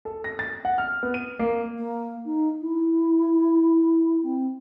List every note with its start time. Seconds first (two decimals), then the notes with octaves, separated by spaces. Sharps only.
0.05 A4
0.24 A#6
0.39 A6
0.65 F#5
0.78 F6
1.03 B3
1.14 D#7
1.39 A#3
1.76 A#3
2.25 D#4
2.60 E4
4.22 C4